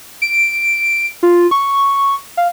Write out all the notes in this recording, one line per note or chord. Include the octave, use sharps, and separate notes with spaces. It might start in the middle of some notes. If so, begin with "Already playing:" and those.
D7
F4
C#6
F5